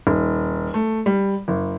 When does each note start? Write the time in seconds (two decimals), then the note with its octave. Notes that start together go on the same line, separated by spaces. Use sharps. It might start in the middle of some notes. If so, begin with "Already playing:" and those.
0.07 D#1
0.74 A3
1.06 G3
1.48 F#1